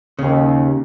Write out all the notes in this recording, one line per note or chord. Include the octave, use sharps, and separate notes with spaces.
D#2 C#3